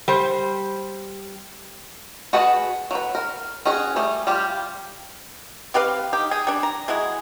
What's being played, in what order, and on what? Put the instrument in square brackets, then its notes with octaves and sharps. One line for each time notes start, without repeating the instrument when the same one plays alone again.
[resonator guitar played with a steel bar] G3 C5
[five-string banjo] F#4 G#4 B4 F#5 A5
F#3 B4
A#4
C#4 F#4 G#4
G3 A3 G#4
G3 F4 G4
[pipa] C4 G4 B4 F5
D#4 G4
G#4
G3 D4
A#5
G#3 E4 F#4 G#4